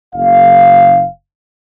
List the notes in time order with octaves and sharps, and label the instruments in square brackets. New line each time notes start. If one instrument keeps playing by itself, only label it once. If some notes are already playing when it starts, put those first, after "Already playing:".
[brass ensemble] F#1 F5